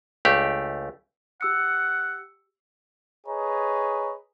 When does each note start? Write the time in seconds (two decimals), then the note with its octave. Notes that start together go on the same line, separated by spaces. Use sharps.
0.25 C#2 A3 D4 G4
1.41 G4 F#5 E6 C#7
3.27 G#4 B4 C#5 D#5 A#5